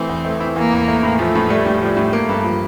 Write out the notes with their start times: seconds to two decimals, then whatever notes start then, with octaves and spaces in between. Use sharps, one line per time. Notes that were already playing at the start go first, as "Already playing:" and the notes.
Already playing: E3 A3 C4 E4
0.09 E2
0.25 A3
0.40 E4
0.56 E3 A#3
0.73 E2
0.88 A3
1.03 A2
1.19 F3 A3
1.35 A2
1.50 G3 A3
1.66 A2
1.81 F3 G3
1.97 A2
2.13 A3 A#3
2.29 G2
2.44 F3